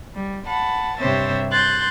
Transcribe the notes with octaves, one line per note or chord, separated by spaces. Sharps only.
G3
F#5 A5 B5
G2 C3 C5 C#5 E5 A6
C6 F#6 G6 A6